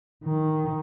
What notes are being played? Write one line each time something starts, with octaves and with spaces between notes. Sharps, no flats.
D#3